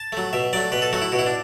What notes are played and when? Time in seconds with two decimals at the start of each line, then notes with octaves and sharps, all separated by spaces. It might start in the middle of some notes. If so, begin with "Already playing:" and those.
Already playing: A5
0.12 F#3 A3
0.33 B2 E5
0.53 F#3 A3 D5
0.72 B2 B4
0.82 A4
0.93 F#3 A3 F#4
1.02 E4
1.12 B2 F#4
1.19 E4
1.26 D4